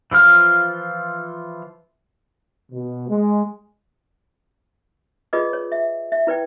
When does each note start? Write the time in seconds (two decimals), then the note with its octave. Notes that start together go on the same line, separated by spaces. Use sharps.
0.11 E3 F3 F4 F6
2.72 B2
3.10 G#3
5.33 F4 G#4 B4 D5 D#5 D#6
5.53 C#5
5.72 E5
6.12 E5
6.27 E4 B4 D5 G5